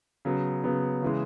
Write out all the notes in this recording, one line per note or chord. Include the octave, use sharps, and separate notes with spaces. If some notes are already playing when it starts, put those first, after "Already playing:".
C#3 F#3 B3
C#3 F#3 B3
C#3 E3 G#3